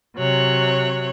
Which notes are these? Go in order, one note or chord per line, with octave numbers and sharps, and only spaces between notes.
C3 F#3 C#5 F#6